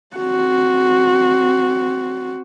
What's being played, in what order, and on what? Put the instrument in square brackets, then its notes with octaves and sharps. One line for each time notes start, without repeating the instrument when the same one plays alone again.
[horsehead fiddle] C4 F#4